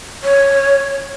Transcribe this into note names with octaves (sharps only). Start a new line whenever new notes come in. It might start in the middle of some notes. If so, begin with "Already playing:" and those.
C#5